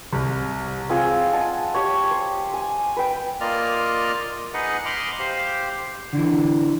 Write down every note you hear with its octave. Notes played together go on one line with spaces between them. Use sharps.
C2
C4 F4 G#4
D#5 F#5 A5
G4 C#5
C5
G#5
B4 G5
A#3 F4 A#4 D5 D#5 F6
D#4 G#4 B4 D#5 F#5
D#5 B5 C6 D6 F6
G4 C5 F5
D3 E3